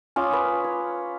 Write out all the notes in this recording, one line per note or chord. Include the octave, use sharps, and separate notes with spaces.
C#4 F4 D6 D#6
B4
C#5